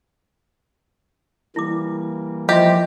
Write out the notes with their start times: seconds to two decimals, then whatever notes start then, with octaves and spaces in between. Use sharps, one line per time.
1.56 E3 G3 A#3 E4 D6
2.49 F3 G4 D#5 E5 C6